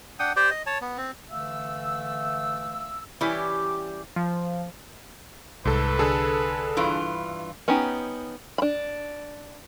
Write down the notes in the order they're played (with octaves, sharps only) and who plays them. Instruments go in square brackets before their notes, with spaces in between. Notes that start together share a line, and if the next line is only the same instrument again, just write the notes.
[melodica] D4 F#5 G5 D#6
G4 C5 D5 G5
D#5
C#5 A5
B3
C4
[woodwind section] D3 E3 A3 E5 F5 E6
[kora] E3 C#4 E4 [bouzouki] G3 G4
[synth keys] F3
[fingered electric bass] C2 [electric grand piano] G#2 A4 [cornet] B4
[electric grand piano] D3 G#4 A4
[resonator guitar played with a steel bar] G2 E3 F4
[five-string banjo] B3 C#4 D#4 G4
D4 B5